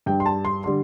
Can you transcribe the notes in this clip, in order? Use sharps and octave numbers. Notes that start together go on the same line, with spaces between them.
G2 G3 G5
C6
A5
C6
D3 G3 C6